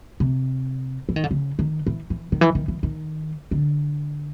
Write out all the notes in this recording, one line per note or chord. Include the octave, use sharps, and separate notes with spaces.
C3
E3
D#3
D3
C#3
D#3
E3
E3
D#3
E3
D#3
E3
D#3
D3